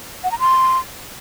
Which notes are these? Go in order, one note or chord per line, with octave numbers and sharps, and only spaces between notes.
F#5
A#5
C6